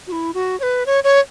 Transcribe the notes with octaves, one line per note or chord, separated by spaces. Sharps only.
F#4
E4
F#4
C#5
B4
C#5
C#5